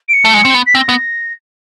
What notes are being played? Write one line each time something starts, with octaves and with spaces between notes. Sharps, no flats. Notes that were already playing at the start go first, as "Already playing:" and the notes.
D7
C#7
A3
G#3
C4
B3
B6
C4 A#6
B3